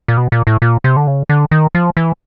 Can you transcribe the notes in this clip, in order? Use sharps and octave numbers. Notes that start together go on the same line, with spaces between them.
A#2
B2
A#2
A2
A#2
C3
D3
C#3
D3
D#3
F3
E3